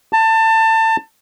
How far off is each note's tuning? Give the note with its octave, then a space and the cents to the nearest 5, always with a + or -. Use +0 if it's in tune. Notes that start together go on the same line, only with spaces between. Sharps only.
A5 +25